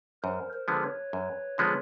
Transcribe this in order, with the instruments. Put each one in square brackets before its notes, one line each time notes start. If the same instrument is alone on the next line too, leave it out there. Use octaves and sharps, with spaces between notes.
[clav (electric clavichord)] F#2 [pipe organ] A#4 C5
[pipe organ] A#4 C5
[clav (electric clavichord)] D3 F3 G#3 B3
[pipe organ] B4 C#5
[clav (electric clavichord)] F#2
D3 F3 G#3 B3